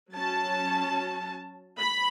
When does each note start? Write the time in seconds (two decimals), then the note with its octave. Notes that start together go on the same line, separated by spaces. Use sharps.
0.16 F#3 C#4 A5
1.79 B5